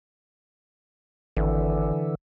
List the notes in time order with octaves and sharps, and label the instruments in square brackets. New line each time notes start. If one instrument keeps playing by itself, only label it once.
[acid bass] G#1 [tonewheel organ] D3 E3